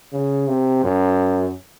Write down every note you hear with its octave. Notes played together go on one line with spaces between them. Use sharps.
C#3
C3
F#2